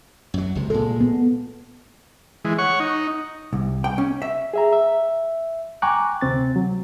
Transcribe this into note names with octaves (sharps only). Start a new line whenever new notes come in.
F#2 F#3
C#2 C3
A#2 G#3 A4
B3
E3 G#3
C#5 F#5 C#6
D#4
C2
G5
C#4
E5
G#4 E5 A#5
E5
G5 G#5 A#5 C#6 D6 F#6
D2 C3 C4 A6
F#3